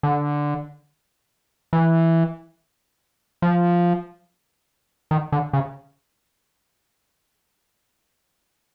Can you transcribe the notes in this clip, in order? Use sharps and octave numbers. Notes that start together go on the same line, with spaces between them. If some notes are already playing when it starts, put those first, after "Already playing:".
D3
E3
F3
D#3
D3
C#3